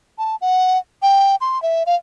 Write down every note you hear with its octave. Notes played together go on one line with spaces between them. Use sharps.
A5
F#5
G5
C6
E5
F5